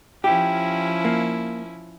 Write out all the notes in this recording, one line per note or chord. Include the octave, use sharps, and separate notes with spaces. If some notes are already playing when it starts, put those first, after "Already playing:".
F3 C#4 E4 G4
A#3